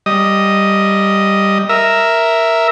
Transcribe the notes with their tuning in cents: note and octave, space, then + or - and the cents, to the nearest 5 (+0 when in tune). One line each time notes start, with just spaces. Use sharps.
G3 +0 D#5 +0
A#4 -5 E5 +0